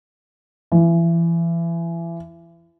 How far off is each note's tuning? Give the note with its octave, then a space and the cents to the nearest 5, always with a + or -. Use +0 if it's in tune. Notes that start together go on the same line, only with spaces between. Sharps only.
E3 +30